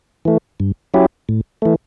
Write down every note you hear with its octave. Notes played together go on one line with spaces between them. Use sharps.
E3 A3
G2
F#3 C#4 E4 G4
A2
E3 A3